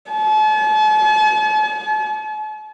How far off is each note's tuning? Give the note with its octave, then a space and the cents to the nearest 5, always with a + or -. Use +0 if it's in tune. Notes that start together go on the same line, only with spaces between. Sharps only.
A5 -45